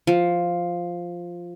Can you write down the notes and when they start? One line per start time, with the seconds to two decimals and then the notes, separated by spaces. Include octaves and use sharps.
0.07 F3